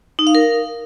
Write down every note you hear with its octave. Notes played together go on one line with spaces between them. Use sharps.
D#4
F5
A#4